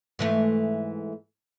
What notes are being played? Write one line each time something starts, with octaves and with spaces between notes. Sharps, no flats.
G#2 E3 A3